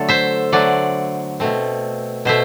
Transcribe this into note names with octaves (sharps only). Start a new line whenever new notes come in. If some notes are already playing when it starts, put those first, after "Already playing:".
Already playing: D3 F#3 A3 A4
C5 E5
D3 F#3 A3 D5 F#5
B2 A3 C4
B2 A3 C5 E5